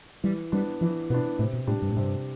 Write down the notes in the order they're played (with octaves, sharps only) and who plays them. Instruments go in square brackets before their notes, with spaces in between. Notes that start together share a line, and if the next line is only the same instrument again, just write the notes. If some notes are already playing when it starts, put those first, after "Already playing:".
[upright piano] E3 [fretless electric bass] G3
[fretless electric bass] G3 [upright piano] B3 D4
[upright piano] E3 [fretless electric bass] F3
[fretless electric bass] B2 [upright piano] B3 D4
[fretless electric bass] A2 [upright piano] C3
[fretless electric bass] B2
[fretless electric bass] A2 [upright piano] G3 D4 G4
[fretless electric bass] G2
A2
[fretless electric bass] G2 [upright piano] C3